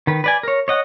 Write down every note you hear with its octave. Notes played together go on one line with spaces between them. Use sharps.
D#3 B4
B4 D5 G#5
A#4 C#5
C#5 D#5 F#5